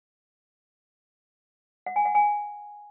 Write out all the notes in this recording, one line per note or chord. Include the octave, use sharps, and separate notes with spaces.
F#5
G#5
F#5
G#5